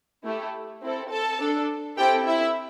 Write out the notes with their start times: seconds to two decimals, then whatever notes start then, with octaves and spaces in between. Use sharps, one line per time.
0.25 A3 E4 G4
0.82 C4 E4 A4
1.11 A4 A5
1.40 D4 A4
1.97 C4 E4 G4 A4 G5
2.26 E4 E5